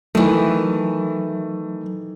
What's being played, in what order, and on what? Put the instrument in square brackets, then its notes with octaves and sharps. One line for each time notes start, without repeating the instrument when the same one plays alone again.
[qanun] D#3 E3 [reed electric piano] F#3 [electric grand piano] A3